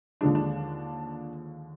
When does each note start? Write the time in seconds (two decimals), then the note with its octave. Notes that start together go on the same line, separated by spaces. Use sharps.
0.21 D#2 D3 F3 G#3 D4
0.35 D4